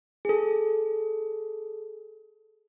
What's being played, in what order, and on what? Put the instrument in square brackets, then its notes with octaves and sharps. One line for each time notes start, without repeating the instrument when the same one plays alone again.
[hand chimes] G#4 A4